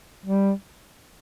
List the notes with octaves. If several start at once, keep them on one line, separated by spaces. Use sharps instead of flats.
G3